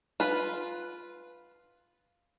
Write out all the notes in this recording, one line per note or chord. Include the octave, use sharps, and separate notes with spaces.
F4 B4